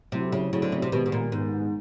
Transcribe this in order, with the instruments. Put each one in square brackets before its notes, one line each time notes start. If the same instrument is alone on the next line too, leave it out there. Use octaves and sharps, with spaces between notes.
[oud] C3 [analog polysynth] F#3 A3 C4 E4
[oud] C#3
[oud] C#3 [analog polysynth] F#3 A3 C4 E4
[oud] D3
C#3
C3
[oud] B2 [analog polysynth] D#3 G#3 B3
[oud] B2
A#2
[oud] G#2 [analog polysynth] D#3 G#3 B3